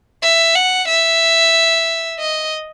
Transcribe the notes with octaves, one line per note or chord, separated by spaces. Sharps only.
E5
F#5
E5
D#5